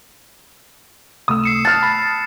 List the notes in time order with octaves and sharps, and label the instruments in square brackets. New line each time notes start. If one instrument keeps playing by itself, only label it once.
[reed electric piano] C#2 C3 A3 [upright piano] D#6 E6
[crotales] C7 C#7 E7
[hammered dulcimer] A5 [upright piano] F6 F#6
[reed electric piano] B5